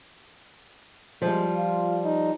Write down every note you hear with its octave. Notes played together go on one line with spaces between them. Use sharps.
F3 G3 G#3
F4
D#4